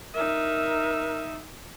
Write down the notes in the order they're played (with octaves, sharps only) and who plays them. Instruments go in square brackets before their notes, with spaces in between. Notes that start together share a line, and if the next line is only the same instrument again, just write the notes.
[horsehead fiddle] D#4 E5 [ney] A#4